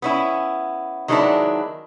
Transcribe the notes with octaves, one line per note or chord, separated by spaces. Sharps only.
B3 C#4 E4
D#3 F#3 G#3 B3 D4 E4